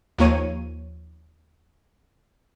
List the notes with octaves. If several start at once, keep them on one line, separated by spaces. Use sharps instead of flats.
D#2 F3 A#3 C#5 D#7